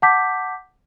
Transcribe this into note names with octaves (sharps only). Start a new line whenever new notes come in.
F#5 A5 D6 G6 B6